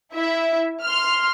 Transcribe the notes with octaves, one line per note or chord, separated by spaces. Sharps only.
E4 E5
C6 F6